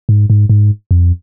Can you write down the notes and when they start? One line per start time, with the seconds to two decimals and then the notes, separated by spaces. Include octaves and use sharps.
0.09 G#2
0.30 G#2
0.49 G#2
0.91 F2